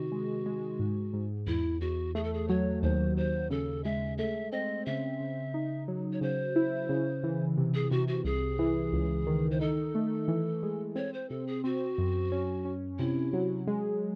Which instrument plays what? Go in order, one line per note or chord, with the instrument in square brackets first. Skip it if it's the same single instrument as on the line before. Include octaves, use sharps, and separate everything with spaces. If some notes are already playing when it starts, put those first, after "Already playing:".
Already playing: [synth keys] C3 D#3 [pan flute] F#4
[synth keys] G#3
G#3
G#2
G#2
[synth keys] E2 [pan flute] E4
[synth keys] E2 [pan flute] F#4
[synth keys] A3 [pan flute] G#4
[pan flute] A4
G#4
[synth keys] F#3 [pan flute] C#5
[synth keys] D#2 [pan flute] C5
[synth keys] D#2 [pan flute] C5
[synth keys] C#3 [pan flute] A4
[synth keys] G#3 [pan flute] E5
[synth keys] A3 [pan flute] E5
[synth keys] C4 [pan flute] D#5
[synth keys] C#3 [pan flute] E5
[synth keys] C#3
D#4
F#3
[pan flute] C#5
[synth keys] C#3 [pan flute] C5
[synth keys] E4
C#3
E3
C3
[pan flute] G#4
[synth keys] C3 [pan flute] F#4
[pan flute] F#4
[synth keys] C2 [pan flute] G#4
[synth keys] E3
C#2
D#3
[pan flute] C5
[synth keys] D#4 [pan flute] A4
[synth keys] A3
E3
G#3
[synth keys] C4 [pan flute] C#5
[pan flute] C5
[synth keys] C3 [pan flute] A4
[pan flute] G#4
[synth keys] C4 [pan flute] F#4
[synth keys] F#2
C#4
C#4
[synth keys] C3 [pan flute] E4
[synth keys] F#3
G#3